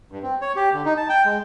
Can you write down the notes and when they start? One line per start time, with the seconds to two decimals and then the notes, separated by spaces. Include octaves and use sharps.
0.12 G2
0.23 C4
0.42 C#5
0.56 G4
0.73 D3
0.86 D#4
0.97 A5
1.09 G5
1.25 G#3